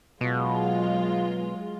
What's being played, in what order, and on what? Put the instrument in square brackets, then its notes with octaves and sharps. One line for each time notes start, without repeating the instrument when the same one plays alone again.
[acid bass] B2 [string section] F#3 G#3 F4